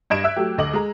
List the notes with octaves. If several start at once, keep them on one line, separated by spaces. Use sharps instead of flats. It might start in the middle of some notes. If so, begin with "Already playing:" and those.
G2 D#5 G#6 D7 E7
E5 E6 F#6
F#3 A3 G4
D2 D#5 D6 F#7
G#3 A#5